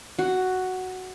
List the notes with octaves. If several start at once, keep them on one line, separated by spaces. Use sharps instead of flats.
F#4